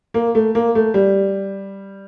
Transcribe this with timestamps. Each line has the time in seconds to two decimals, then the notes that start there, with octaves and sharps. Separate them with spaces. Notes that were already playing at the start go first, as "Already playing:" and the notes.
0.14 A#3
0.35 A3
0.55 A#3
0.75 A3
0.94 G3